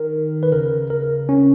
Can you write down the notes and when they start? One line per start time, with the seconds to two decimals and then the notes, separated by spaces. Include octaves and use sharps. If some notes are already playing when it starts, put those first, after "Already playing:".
Already playing: D#3 A#4
0.43 B4
0.52 C#3 A#4
0.90 A#4
1.29 C#4